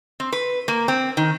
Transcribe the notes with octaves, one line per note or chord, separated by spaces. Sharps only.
C4
B4
A#3
C4
D#3